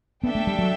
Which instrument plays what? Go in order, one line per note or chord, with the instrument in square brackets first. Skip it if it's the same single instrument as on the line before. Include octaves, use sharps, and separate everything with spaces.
[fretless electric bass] B3 [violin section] D4 A4 E5 G5
[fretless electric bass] A3
G3
F#3